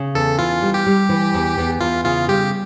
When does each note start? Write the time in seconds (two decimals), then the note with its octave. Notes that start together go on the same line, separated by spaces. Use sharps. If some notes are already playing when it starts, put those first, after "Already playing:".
Already playing: C#3
0.15 E2 A4
0.38 E3 F4
0.62 G3
0.74 G4
0.86 G3
1.09 E3
1.34 E2
1.58 E2
1.81 E2 F4
2.05 C#3 F4
2.28 G3 G4